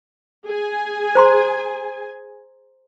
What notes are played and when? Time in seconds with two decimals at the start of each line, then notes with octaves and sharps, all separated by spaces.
0.45 G#4 G#5
1.15 C5 A#5 C6